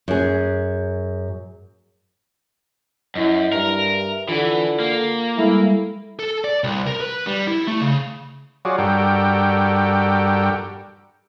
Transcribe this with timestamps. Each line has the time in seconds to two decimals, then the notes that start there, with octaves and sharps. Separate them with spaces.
0.08 F#2 G#4
3.15 F#2 E4 D#5
3.53 G2 A#4 E5
4.29 D3 E3 F4 A4 F#5
4.80 A#3
5.38 G3 G#3 E4 A4
6.19 A4
6.44 D5
6.64 C2
6.87 A#4
7.00 B4
7.27 G3
7.47 E4
7.67 A3
7.81 C#3
8.65 F#3 F4 F#4 G#4 C#5 D5
8.78 G2 G3 F#4 A4 A#4 G5